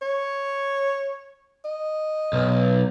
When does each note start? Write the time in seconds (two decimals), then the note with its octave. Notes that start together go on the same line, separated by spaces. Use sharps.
0.02 C#5
1.65 D#5
2.33 B1